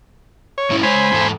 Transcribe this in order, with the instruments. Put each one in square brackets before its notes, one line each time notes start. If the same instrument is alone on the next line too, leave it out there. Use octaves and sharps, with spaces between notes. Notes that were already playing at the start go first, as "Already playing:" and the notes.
[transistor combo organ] C#5
[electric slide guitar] G#2 C#4 E4
[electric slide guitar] G#3 C#5 [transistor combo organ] C5 G#5 B5
[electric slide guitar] E2 G#2 A4